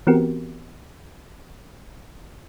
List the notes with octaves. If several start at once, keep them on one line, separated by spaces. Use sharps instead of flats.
E3 B3 C4 F#4 G4 A#4